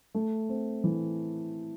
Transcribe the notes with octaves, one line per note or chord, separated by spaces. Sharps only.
A3
C4
E3